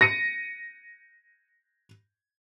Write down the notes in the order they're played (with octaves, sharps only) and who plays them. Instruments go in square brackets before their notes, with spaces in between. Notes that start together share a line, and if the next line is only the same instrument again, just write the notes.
[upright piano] A#6 C#7 D#7